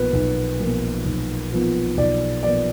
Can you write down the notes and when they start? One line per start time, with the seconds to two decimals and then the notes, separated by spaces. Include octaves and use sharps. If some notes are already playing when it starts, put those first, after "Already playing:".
Already playing: B1 A#2 F3 B3 B4
0.13 B1
0.60 A#2 F3 B3
1.05 B1
1.52 A#2 F3 B3
1.97 B1 D5
2.43 A#2 F3 B3 D5